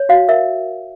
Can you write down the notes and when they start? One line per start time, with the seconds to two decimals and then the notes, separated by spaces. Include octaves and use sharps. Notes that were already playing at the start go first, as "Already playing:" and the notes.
Already playing: C#5
0.09 F#4 F5
0.28 A#4 E5